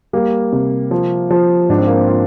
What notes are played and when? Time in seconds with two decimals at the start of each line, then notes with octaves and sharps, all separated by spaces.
0.13 G3 A#3
0.52 C3
0.91 F3
1.31 F3
1.69 G#2 D4
1.78 C4
1.87 A#3
1.96 C4
2.08 F4